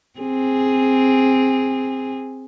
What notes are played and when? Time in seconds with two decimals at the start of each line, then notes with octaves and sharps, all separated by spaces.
0.19 C4 G#4